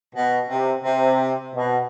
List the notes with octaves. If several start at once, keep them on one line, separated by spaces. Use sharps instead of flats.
B2
C3
C3
B2